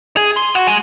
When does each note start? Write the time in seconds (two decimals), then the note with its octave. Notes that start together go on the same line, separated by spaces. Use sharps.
0.17 G#4
0.37 C6
0.55 F#4
0.67 G#3